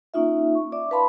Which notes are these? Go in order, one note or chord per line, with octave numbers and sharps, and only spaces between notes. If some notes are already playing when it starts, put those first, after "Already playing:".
A#3 C#4 D#4 F4 E5
C#6
D5 E5 D6
B4 F5 A5 B5 C6